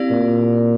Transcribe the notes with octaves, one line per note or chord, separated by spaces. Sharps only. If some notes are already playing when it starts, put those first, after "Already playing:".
Already playing: C4 E4 G4 D5 F5
A#2